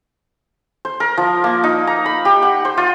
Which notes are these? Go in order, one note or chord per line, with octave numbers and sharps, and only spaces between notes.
C5
A#4
F3
A#3
D#4
A#5
B5
G4
F#5
C5
F4